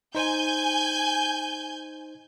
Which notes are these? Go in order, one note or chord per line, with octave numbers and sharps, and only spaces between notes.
D#4 C5 G#5 G6